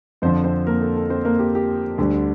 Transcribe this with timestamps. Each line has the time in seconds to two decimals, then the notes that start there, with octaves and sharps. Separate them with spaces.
0.22 F2 D3 F3 C4 C5
0.44 C4 C5
0.67 A#3 A#4
0.81 A4
0.96 A4
1.10 C4 C5
1.25 A#3 A#4
1.39 G4
1.55 G4
1.98 D2 D3 G3